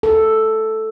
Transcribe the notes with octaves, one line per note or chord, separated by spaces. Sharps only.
A4